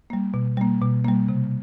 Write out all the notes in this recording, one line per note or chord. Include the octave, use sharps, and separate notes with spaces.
G3 A#3
B2
G3 A#3
B2
G3 A#3
C3